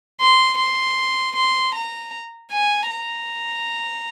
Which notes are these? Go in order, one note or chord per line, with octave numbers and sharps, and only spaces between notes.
C6
C6
C6
A#5
G#5
A#5